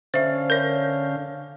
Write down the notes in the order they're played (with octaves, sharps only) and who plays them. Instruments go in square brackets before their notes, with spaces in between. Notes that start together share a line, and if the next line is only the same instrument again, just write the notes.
[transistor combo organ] D3 C#4 F5 [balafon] C5 E5
[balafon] A#4 C#5